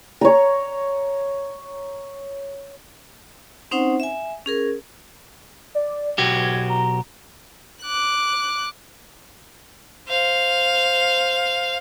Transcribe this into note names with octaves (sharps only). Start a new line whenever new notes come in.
C#5 A#5
C4 C#4 D#4 C5 F#5
E5 G#5
C#4 G#4 A#4
D5
B1 F#4 G4 G#6
A#5
D6 F#6
C5 F5